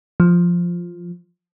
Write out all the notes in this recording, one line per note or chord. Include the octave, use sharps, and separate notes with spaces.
F3